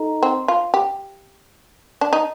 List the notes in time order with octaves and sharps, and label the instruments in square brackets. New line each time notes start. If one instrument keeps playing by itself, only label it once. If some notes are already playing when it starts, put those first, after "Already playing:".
Already playing: [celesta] D#4 A4 D#5 A#5
[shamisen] C4
F4
G4
D4
D#4